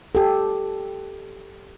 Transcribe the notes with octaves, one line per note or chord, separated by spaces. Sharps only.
G4 A4